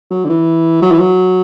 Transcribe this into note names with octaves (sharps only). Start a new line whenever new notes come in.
F#3
D3
E3
F#3
E3
F#3